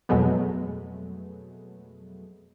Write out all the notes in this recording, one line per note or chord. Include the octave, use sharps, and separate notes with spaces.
F2 B2 F#3 G#3 A3 B3